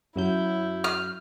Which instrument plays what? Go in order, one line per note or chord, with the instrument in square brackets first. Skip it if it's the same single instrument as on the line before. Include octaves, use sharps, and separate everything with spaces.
[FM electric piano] F#2 F#3 G6 [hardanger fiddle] E4
[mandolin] F6